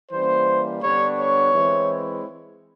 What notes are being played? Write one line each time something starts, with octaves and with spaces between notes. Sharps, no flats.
E3 G3 A#3 C#4 C5
D3 G3 B3 D4 C#5
C#5
E3 G#3 C4 E4